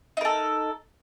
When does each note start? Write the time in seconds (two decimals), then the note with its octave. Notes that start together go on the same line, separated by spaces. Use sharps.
0.17 D#4
0.21 A#4
0.25 A4